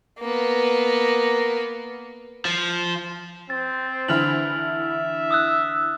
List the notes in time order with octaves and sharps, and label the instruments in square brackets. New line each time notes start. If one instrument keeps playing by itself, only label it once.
[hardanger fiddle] A#3 B3
[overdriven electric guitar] F3
[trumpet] C4 [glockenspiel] A6
[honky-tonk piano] D3 E3 E4 [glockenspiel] F6 F7 F#7
[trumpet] E5
[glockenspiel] D#6 E6 F#6